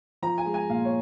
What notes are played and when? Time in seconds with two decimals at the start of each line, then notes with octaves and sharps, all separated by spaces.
0.22 F3 A#5
0.38 G#5
0.46 G#3
0.54 G#5
0.70 A#2 F5
0.85 C#5